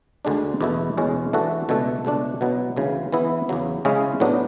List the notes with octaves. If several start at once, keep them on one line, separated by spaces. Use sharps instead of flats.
D2 D3 G#3 D4
E2 B2 A3 E4
E2 B2 G#3 C#4
E3 A3 D4 F#4 A4
C#2 B2 A3 D4 A4
C#2 B2 A3 D4
B2 F#3 B3 E4
D2 C#3 E3
E3 B3 E4
E2 C#3 F#3
C#3 G#3 C#4 E4 G#4
A2 F#3 B3 D4